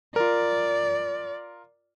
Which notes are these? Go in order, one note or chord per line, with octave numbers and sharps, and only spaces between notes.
F4 A#4 D5